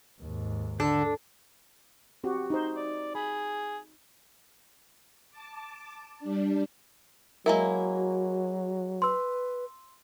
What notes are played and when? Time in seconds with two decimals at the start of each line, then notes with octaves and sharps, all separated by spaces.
0.21 D#2 G#2
0.80 D3 D4 A4
2.24 C4 F#4 G4
2.50 D#4 C5
2.76 D5
3.15 G#4 B5
5.31 A5 D6
6.19 G3 D4
7.46 F#3 G#3 A#3 E4 F#4 A#4
9.02 B4 C6 E6